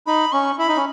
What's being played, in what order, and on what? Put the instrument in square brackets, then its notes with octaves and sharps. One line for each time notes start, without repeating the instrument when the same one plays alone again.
[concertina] D#4 [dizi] B5
[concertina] C#4 [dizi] C#6
[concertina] E4 [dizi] B5
[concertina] D#4
C#4